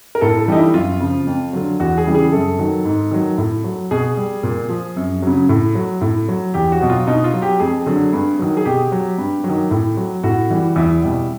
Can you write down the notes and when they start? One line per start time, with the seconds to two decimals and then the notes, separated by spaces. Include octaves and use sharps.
0.15 A#4
0.21 A2 A4
0.39 A4
0.48 E3 G3 D#4
0.56 E4
0.74 F#2 F4
1.00 C#3 F3
1.27 F2
1.53 D3 F#3
1.80 E2 F#4
1.98 G#4
2.06 C#3 E3 G3
2.15 G#4
2.32 F#2 A4
2.59 D#3 F#3
2.85 G#2
3.11 D#3 F#3
3.38 A2
3.64 F#3
3.91 B2 G#4
4.17 G3
4.43 A#2
4.69 F3
4.96 F#2
5.22 C#3 F#3
5.49 A2
5.75 F#3
6.01 A2
6.29 F#3
6.54 E2 G4
6.72 F#4
6.81 B2 F#3
6.90 F4
7.07 B2 D#4
7.24 F4
7.34 F#3
7.42 G4
7.60 F2 G#4
7.86 D3 F#3
8.13 G2
8.39 D#3 F#3
8.57 G#4
8.65 B2 G4
8.92 F#3
9.18 G2
9.44 F#3
9.49 D#3
9.71 A2
9.97 F#3
10.23 A2 F#4
10.50 E3 G3
10.76 E2 E4
11.03 B2 G3